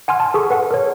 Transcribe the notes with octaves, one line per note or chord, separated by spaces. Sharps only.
F#5 G#5 C6 F6
A5
G#4 A4 C#6
B4 F#5
A#4 C#5